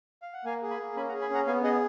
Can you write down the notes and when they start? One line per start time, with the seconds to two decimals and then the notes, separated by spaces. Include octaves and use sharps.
0.22 F5
0.33 F#5
0.45 A#3 F5 G#5
0.63 G#4
0.71 G#5 B5
0.80 A#3
0.96 C#4 G#5 B5
1.09 F#5 A#5
1.13 G#4
1.22 G#5 B5
1.30 C#4 F#5 A#5
1.47 B3 F5 G#5
1.63 G#4 D#5 F#5